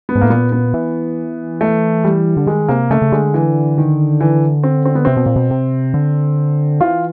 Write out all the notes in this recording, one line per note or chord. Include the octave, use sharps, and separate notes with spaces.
B3
G#2
A2 A#3
A#2 B3
B3
E3
A3
G3
D3
D#3 G#3
C3 A#3
C#3 A3
C#3
D3 G#3
E3
D#3
E3
C4
C4
B3
C3 C4
B2
A#2
B2
C3
D3
E3 F4